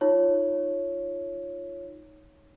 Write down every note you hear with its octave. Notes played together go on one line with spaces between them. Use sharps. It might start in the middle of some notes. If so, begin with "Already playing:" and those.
D#4 F4 C#5